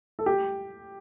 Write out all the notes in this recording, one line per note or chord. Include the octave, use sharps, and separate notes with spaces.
A4
G4